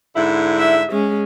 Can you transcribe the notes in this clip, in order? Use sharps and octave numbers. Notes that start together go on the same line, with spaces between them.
G#2 D3 E4
E5
G#3 C#4